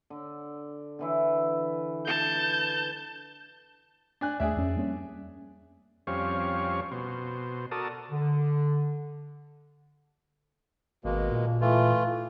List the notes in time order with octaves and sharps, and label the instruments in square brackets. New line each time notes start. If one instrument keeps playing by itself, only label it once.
[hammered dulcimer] D3
D3 E3 E4
[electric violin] A5 G6
[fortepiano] D4 G#5 F#6
[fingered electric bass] D#2 A3 [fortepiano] G#4 D5 E5
[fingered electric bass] F2 C#4
G3 A#3 C#4
[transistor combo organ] F2 G3 C4 C#4 F5 C#6
B2 C5
F#4 A4 A#4 D5 A5 D#6
[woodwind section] D3
[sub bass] G#1 [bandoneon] B2 G#3 A#3
[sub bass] A#2
[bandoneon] E3 A3 F4